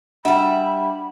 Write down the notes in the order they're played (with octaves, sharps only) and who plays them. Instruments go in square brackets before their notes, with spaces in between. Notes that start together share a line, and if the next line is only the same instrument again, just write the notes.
[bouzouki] G3 E5 [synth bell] D4 F#5 [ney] B5